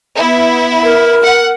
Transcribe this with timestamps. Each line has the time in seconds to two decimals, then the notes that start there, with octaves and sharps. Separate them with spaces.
0.15 B3 E4
0.84 A#4
1.24 F#5